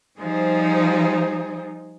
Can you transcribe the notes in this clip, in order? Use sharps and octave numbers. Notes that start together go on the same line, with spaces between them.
F3 G3 D#4 G#4 C5